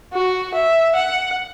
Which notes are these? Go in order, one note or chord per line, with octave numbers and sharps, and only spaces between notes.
F#4
E5
F#5